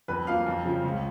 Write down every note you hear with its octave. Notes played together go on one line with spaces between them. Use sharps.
F2 B4
F3 A#3 F5
F2
C#3 F3
C#2